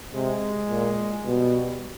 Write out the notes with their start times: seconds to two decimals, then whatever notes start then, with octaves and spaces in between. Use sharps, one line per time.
0.14 C3 G#3
0.69 A#2
1.25 B2 G3